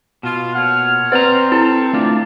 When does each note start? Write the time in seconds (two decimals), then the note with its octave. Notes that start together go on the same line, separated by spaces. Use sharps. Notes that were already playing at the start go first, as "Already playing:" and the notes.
0.23 B2 F4
0.54 A#2 C#5 F#5 F6
1.12 C4 B4 C5 D5 A#5
1.52 E4 A4
1.93 A3 D4 F4 D5